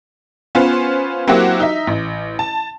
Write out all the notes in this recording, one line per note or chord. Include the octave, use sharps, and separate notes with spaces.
B3 C#4 F4 B4 C5
F#3 A#3 C4 E4 F#4 G4
D#4 E5
A1
A5